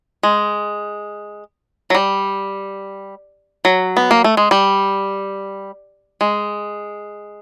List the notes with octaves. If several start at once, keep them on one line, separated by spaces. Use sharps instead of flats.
G#3
F#3
G3
F#3
B3
A#3
A3
G#3
G3
G#3